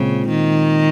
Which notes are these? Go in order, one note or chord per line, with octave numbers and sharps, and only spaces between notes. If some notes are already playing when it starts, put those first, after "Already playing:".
Already playing: A#2 C#3 G#3 C4 F4
D#3